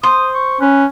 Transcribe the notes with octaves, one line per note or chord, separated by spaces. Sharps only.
C5 D#6
C#6
C#4 B4